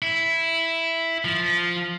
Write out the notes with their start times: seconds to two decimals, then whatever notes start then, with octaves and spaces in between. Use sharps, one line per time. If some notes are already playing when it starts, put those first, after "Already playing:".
0.02 E4
1.25 F3